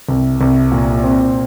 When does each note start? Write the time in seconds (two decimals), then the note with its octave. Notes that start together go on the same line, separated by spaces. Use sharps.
0.09 C2
0.41 C2
0.72 A#2
1.03 C4